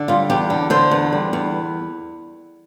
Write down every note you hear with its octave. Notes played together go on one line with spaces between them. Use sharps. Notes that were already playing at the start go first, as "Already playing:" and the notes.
Already playing: D3
G3 F4
E2 G4
D3
D3 C5
E2
G3
E2